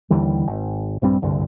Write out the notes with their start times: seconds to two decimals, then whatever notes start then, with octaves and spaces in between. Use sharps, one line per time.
0.10 D#2 D3 E3 G3
0.47 G#1
1.02 A#1 G2 G3 C4
1.22 F#1 C2 G2 D3